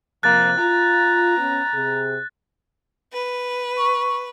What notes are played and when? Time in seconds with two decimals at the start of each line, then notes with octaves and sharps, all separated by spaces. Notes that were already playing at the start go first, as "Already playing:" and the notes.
0.23 C3 F3 A#3 F#6 A6
0.59 F4 A#5
1.38 B3 C#4
1.74 C3 G#4
3.13 B4
3.76 C#6